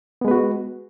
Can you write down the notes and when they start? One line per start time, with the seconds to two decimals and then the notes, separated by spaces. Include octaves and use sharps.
0.21 B3
0.25 G#3
0.28 B4
0.31 F#4